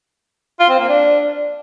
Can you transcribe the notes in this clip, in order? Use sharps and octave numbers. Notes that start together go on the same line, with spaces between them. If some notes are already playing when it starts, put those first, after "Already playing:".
F4
C4
A#3
D4